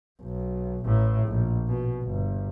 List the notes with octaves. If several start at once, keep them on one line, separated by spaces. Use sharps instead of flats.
B1
A1 A2
A#1
B2
G1